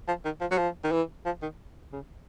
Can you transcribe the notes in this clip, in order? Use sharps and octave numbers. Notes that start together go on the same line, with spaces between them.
F3
D#3
F3
F#3
F3
D#3
E3
F3
D#3
C#3